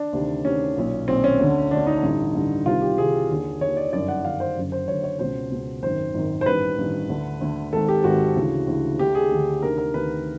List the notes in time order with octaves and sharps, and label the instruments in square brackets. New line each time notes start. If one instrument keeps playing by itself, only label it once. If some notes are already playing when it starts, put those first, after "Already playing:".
Already playing: [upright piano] D4
D2 C3 D#3
D2 C3 D#3 C#4
B1 A#2
B1 A#2 C4
C#4
D2 D3
D2 D3 D4
D#4
A1 G2 D3
A1 G2 D3
C2 C3 D#3 F4
G4
C2 C3 D#3 G#4
D#2 D3
D#2 D3 C#5
D5
G1 F#2 D#3 D5
F#5
G1 F#2 D#3 F5
C5
F#1 F#2 D3
C5
F#1 F#2 D3 C#5
C#5
C#2 B2 C5
C#2 B2
G#1 F#2 D#3 C5
G#1 F#2 D#3
C5
A1 G2 D#3 B4
A1 G2 D#3
D2 D3
D2 D3
G#1 G#2 D#3 A4
G4
G#1 G#2 D#3 F#4
D2 C#3 E3
D2 C#3 E3
D2 D3 G4
G#4
D2 D3
D2 C3 D#3 A#4
A#4
D2 C3 D#3 B4